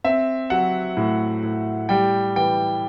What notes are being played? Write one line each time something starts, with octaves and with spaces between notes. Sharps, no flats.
C4 E5
F#3 F#5
A2
A2
G3 G5
E3 G5